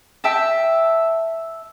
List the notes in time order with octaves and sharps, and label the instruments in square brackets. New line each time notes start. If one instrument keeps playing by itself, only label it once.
[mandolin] E5 G5 A5